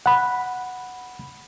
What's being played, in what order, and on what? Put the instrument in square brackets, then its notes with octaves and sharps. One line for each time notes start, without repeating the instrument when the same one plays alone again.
[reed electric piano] F#5 B5